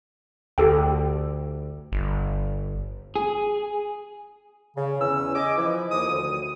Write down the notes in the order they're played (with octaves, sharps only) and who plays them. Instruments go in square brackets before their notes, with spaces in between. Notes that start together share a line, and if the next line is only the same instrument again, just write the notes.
[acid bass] D2 [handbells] G4 A4 G5
[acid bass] G1
[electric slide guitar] G#4
[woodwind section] C#3
E2 C#4 E6
D#5 G#5 D6
E3 F3 E4
D#2 F3 D#6
D2 D#6